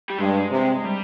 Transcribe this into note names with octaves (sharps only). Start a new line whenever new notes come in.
G3
G2 G#3
C3
G3